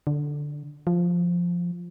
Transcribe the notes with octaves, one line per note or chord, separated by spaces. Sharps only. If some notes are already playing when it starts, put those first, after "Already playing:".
D3
F3